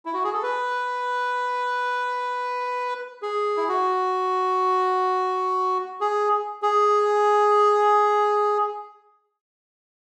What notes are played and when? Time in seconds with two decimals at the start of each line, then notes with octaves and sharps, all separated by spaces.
0.05 E4
0.14 F#4
0.24 G#4
0.33 A4
0.43 B4
3.22 G#4
3.57 E4
3.69 F#4
6.01 G#4
6.63 G#4